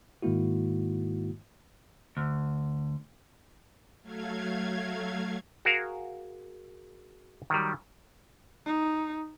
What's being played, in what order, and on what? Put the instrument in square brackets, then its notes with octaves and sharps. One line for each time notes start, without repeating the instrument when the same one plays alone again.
[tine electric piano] G#2 D#3 G#3 A#3 E4 F#4
[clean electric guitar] D2
[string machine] F#3 A3 F5 G#6
[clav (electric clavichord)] F#4 G#4 A#4 F5
D#3 F#3 G3
[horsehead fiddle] D#4